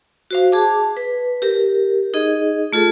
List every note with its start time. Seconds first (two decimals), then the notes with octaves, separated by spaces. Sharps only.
0.31 F#4 C5 F5
0.52 G#4 A5 D6
0.97 B4
1.42 G4 A#4
2.14 D#4 G#4 D#5
2.73 A3 F4 G#4 A4